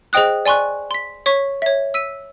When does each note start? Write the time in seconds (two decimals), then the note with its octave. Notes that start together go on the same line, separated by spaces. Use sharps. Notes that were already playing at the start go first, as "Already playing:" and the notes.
0.13 G#4 C5 D#5 G5 D#6 F#6
0.46 D5 G#5 C6 C#6 F#6
0.91 C6 B6
1.26 C#5 C#6 B6
1.62 C#5 E5
1.94 E6 B6 D#7